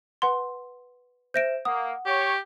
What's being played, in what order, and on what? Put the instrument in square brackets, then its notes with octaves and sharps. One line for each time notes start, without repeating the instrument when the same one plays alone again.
[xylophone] B4 F#5 C6
[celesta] C5 E5 E7 [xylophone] G6 A#6 D7
[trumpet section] A#3 [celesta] F#5 [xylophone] D#6
[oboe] G4 [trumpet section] C#5